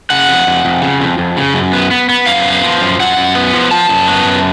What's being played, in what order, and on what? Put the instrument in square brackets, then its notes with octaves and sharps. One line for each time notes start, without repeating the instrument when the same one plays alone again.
[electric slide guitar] C#3 F#5
F2
F2
F2
C#3
F2
F2
C#3
F#2
B3
B3
B3
F#2 F5
B3
F3
F#2
F#2 F#5
F#2
B3
F3
F3 A5
F#2
B3
F#2